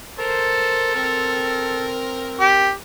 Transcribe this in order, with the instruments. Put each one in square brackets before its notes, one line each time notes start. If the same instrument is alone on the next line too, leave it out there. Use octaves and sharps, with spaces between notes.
[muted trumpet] A4 [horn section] A#4 C5
[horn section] C4 A#4
[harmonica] G4